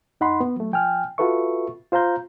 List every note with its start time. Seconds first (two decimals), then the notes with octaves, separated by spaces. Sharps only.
0.21 F#2 D#4 F#5 B5 C6
0.40 B3
0.56 F#3 A3
0.72 F3 G5 G#5 F6
1.18 F4 F#4 A4 B4 E5 C#6
1.92 F4 C5 F5 A#5 G6